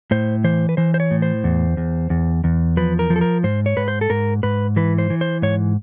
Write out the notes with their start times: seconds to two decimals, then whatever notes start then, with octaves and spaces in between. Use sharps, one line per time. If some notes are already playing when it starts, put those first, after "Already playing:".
0.11 A2 C5
0.44 E3 C5
0.69 B4
0.77 E3 C5
0.94 C5
1.00 C#5
1.11 A2
1.22 C5
1.44 E2
1.77 E2
2.10 E2
2.44 E2
2.77 F3 B4
2.99 A#4
3.10 F3
3.16 A4
3.21 A#4
3.44 G#2 C5
3.66 C#5
3.77 G#2 B4
3.88 C5
4.01 A4
4.10 G#2 A#4
4.43 G#2 B4
4.76 E3 B4
4.98 C5
5.10 E3
5.21 C5
5.42 G#2 C#5